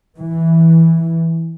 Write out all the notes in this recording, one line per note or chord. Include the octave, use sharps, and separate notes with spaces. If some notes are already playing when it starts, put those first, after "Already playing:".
E3